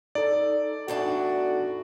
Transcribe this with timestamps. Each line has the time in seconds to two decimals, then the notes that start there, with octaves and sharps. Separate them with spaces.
0.15 D#4 A4 D5
0.88 E2 A2 D4 F#4